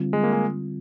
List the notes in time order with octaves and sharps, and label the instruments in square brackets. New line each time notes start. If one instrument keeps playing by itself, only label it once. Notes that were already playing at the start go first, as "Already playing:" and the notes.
Already playing: [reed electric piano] D3 G3 C4 F4
[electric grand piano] G#3
A#3
G#3